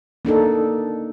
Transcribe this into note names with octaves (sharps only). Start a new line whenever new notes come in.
A#3 D4 D#4 A4